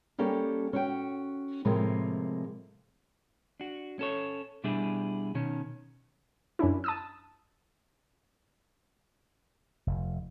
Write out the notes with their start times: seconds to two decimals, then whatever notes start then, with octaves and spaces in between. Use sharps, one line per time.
0.18 G3 A#3 C#4 G4 A4
0.73 C#4 F#4 G5
1.65 A2 C3 F3 G#3 A#3
3.60 D4 F#4
3.99 C#4 A4 C#5
4.64 B2 G3 D4 E4 G4 G#4
5.35 B2 D#3 C#4
6.59 F#2 C#4 D4 E4
6.84 A5 D#6 E6
9.87 F1